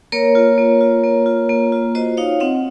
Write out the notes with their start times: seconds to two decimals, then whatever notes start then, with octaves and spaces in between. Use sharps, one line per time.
0.12 A#3 A#4 C#5
0.35 F4
0.58 A#3
0.81 F4
1.03 A#3
1.26 F4
1.49 A#3
1.72 F4
1.95 F#4 C5 D#5
2.17 D#4 C#5 F5
2.40 C4 D#5 F#5